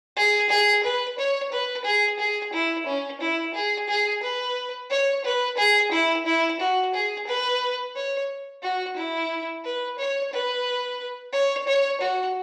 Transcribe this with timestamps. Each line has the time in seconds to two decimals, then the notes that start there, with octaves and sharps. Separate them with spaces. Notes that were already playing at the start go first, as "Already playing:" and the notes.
0.16 G#4
0.50 G#4
0.83 B4
1.18 C#5
1.52 B4
1.85 G#4
2.19 G#4
2.53 E4
2.86 C#4
3.21 E4
3.54 G#4
3.89 G#4
4.23 B4
4.90 C#5
5.24 B4
5.57 G#4
5.91 E4
6.26 E4
6.60 F#4
6.94 G#4
7.27 B4
7.95 C#5
8.63 F#4
8.97 E4
9.64 B4
9.98 C#5
10.32 B4
11.33 C#5
11.67 C#5
12.01 F#4